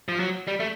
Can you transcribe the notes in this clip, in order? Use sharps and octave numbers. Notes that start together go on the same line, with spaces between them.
F3
F#3
G3
A3